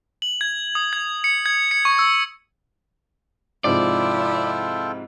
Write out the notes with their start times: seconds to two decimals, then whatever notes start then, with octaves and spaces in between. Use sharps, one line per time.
0.22 F#7
0.41 G#6
0.75 D#6
0.93 G#6
1.24 C#7
1.46 G#6
1.71 C#7
1.85 C#6
1.99 E6
3.64 G#2 C3 F3 E4 F4 A4 D5 G5